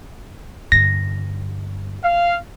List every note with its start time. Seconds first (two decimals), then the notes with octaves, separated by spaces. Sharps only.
0.72 G2 D3 A#6
2.04 F5